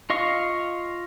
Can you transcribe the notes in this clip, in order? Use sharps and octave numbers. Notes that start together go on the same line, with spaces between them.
F4 D#5 F5 C#6